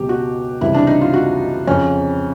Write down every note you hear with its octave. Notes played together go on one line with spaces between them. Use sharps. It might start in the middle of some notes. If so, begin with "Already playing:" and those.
Already playing: C#2 B2 F#3 G4
F#4
C#2 C3 E3 G3 E4
D4
D#4
F4
F#4
F2 C#3 F3 C#4